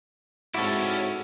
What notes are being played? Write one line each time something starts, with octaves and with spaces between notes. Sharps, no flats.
G#2 C4 C#4 E4 F#4 A4 D5